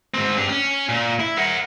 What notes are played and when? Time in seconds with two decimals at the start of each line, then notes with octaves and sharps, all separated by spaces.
0.14 G#2 C4
0.38 D4 G4
0.49 C#4
0.89 A#2
1.20 E4
1.38 A#4 F#5